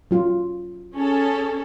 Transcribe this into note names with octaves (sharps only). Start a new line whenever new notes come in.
F#3 F4
C#4 G#4 A4